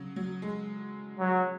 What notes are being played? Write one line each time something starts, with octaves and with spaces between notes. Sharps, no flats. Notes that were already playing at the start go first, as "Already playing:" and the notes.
Already playing: C#3 F#3
F#3
G#3
F#3